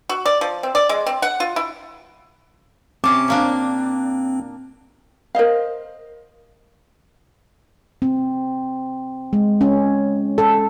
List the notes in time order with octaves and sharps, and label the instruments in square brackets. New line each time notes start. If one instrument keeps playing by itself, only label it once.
[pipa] F#4
D5
F3
C4
D5
G#3
C4
F#5
F4
E4
[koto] C3 C#4 A5 [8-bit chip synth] C4 [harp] D6
[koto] A#2 A#3 D4
[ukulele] A#4 C5 D#5 F5
[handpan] C4
G#3
C#4
A4